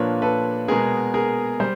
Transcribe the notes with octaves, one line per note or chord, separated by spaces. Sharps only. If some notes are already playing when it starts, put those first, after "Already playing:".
Already playing: A#2 F3 A#3 D4 B4 C#5
A4 B4
B2 G#3 B3 G#4 A#4
G#4 A#4
G3 C5